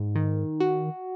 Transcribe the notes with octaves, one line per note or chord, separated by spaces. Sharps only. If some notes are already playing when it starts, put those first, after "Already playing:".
Already playing: G#2
D#3
F#4